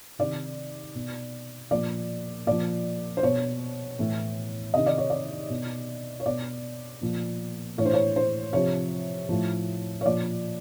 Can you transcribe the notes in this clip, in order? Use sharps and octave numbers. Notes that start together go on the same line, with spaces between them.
C3 D#3 D5
B2
A#2 F3 D5
A#2 F3 D5
C5
B2 C#5
A2 E3
C3 D#3 D#5
D5
C#5
D5
B2
C#5
B2 D5
A#2 F3
A2 E3 C#5
C5
C#5
C5
C3 F3 C#5
A2 F3
C#5
A#2 F3 D5